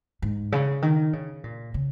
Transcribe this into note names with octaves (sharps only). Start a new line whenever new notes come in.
G#2
C#3
D#3
C#3
A#2
C#3